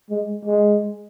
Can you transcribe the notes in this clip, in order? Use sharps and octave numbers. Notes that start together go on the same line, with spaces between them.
G#3
G#3